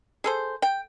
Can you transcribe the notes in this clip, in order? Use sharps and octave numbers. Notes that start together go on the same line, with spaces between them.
G#4 A4 C5
G5